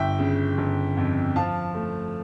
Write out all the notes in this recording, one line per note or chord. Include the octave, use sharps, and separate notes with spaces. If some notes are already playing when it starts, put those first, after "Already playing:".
Already playing: G1 E5 G5
C#3
G1
F2
F3 F5 A5
A3